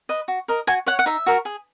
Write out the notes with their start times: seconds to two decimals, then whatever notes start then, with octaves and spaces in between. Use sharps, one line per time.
0.09 B4 D#5
0.28 F#4
0.48 A#4 D#5
0.67 F#4 G#5
0.86 C#5 F#5
0.99 F#5
1.06 D#4 E5
1.26 F#4 A#4
1.45 G#4